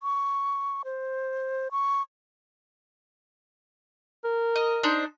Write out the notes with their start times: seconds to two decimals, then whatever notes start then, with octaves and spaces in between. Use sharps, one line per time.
0.03 C#6
0.85 C5
1.72 C#6
4.24 A#4
4.56 D#5
4.83 D4 D#4 C5